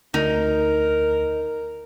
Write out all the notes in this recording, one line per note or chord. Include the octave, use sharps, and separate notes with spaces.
D2 D#4 A#4